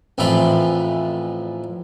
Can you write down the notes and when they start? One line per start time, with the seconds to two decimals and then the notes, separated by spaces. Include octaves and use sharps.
0.18 A1 F2 A2 E3 F4 B5